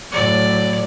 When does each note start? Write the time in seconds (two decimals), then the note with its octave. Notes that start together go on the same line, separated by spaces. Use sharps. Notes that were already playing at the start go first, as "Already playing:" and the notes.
0.12 A2 F#3 D5